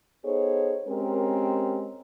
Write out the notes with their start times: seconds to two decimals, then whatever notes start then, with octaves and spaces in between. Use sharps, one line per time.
0.25 B3 D#4 G#4 A4 C5 C#5
0.88 G#3 C4 C#4 G4 A#4